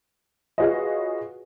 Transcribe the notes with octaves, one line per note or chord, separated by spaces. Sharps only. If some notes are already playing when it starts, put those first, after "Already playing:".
F4 F#4 G#4 B4 C#5 D#5